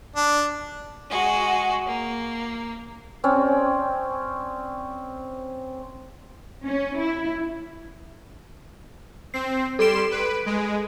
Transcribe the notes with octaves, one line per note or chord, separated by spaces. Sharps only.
D4
G#3 F#4
A#3
C4 C#4 D5
C#4
E4
C4 C7
G3 A4 C6 D7 E7
B4
G#3